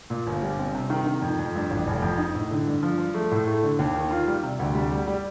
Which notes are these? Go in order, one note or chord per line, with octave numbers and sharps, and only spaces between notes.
A#2
G1
G3
C4
C3
D#3
D#3
F2
F2
G2
A1
F1
F2
D#4
A2
D3
G2
F3
F3
A3
A2
A3
D3
D#2
D#3
F4
G3
C3
D2
G3
G3
G3